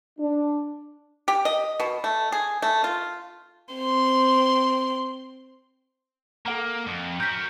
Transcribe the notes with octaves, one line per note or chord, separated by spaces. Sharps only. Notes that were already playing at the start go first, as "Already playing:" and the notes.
D4
G4
D#5
B2
A3
G#4
A3
F4
C4 C6
A#3 A4 F#5 A#5
F2
F#4 A#4 G6 B6